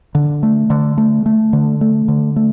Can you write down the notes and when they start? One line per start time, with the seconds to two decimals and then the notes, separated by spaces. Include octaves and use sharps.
0.15 D3
0.43 A3
0.70 D3
0.98 A3
1.26 A3
1.53 D3
1.81 A3
2.08 D3
2.36 A3